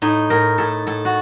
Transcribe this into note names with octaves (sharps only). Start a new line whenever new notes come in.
A2 D#4
A2 A#4
A2 A4
A2 A4
F#4